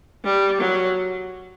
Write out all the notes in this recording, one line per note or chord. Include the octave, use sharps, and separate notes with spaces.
G3
F#3